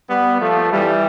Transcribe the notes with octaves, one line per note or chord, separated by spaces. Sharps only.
G3 B3
F3 A3
E3 G3